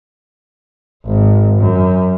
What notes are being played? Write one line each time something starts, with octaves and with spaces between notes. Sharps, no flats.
G#1
F#2